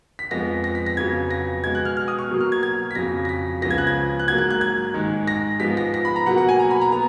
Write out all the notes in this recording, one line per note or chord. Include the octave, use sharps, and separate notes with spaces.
B6
F2 F3 G#3 B3 A#6
A#6
B6
A#6
F2 C#3 F#3 B3 G#6
A#6
B2 G#3 B3 G#6
F#6
F6
F6
D#6
C#6
B2 F#3 A#3
F6
G#6
G#6
B6
F2 C#3 F#3 A#6
A#6
B6
C#2 C#3 F3 B3 A#6
G#6
F#6
G#6
F#6
G#2 F#3 A#3 G#6
F#6
F#6
G#6
G#2 D#3 G#3
A#6
G#2 F3 G#3 B3 B6
A#6
A#6
B5
A#5
B2 F#3 A#3 F#5
F#5
G#5
A#5
B5
A#5
B3 A#5